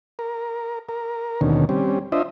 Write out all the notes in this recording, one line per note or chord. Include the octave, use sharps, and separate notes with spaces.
A#4
A#4
D#2 B2 D3 D#3 C#4
G3 C4 C#4
D4 F4 C5 D#5 E5